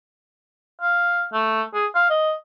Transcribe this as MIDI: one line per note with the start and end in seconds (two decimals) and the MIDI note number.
0.81 1.27 77
1.33 1.63 57
1.74 1.87 68
1.95 2.09 77
2.10 2.34 75